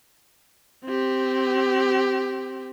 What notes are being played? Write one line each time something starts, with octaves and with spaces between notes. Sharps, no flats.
C4 G4